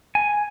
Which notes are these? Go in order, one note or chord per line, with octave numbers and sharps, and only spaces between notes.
G#5